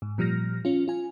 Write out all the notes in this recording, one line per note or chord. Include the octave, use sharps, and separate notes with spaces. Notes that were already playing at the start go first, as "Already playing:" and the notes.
G#2
A#2 F3 G3 F6 A#6
C#4 F4
F4 G#5